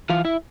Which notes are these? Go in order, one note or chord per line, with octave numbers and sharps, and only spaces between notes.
E3 F4 F5
E4 E5